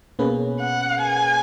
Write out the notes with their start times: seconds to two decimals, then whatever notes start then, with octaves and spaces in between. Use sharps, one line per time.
0.19 B2 A#3 C#4 G#4 B4
0.60 F#5
1.02 G#5